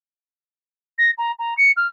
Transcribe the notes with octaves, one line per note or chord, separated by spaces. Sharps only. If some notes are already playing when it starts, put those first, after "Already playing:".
A#6
A#5
A#5
C#7
F6